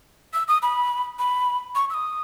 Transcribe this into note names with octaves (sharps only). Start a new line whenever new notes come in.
E6
D#6
B5
B5
C#6
E6
D#6